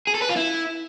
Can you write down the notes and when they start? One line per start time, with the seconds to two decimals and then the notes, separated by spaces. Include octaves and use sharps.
0.07 G#4
0.15 A4
0.22 B4
0.29 F4
0.36 E4